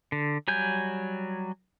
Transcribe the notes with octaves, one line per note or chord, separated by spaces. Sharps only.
D3
F#3 G3 G#5 G6